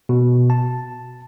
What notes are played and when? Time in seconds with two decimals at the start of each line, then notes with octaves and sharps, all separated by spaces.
0.09 B2
0.50 A5